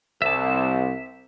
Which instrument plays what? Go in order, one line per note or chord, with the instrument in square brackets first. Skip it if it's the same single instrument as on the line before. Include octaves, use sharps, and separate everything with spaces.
[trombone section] C2 [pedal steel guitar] E5 A5